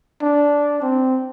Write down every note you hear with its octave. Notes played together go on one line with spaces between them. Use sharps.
D4
C4